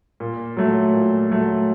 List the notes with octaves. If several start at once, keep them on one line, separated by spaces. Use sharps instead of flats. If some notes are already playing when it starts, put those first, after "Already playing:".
A#2
F#3 A3
A#2
F#3 A3